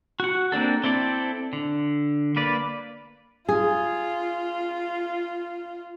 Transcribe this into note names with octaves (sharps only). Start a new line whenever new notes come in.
F#4 F#5
A#3 C4 D4 A4
C4 E4 A4 D5
D3
A#3 B4 D5
F4 G#4